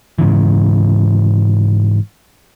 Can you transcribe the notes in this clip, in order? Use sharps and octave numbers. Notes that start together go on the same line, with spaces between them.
G#2 C#3 E3